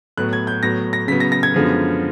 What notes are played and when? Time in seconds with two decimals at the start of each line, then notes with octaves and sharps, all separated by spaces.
0.18 A2 F#3 B3 F#6
0.33 G#6
0.47 G6
0.63 A2 F#3 B3 A#6
0.93 A#6
1.08 C#3 F#3 B3 B6
1.20 A#6
1.32 A#6
1.43 G#6
1.54 F#2 D3 F3 G#3 B3